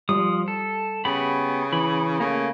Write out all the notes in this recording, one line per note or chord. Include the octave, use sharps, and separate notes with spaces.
F3 G3 D#6
A4
C#3 B3 G4 B5
E3 B5
C#3 A3 A#3